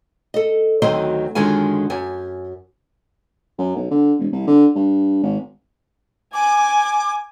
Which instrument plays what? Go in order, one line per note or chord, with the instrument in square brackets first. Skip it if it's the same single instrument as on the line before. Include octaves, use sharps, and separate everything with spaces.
[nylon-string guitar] A4 D#5
D2 D#3 F#3 C4 C5 D#5
F#2 D3 D#3 G#3 F4 G#5
F#2 G#5
[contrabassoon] F#2
B1
D3
E1
C2
D3
G2
G#1
[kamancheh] G#5 [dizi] D6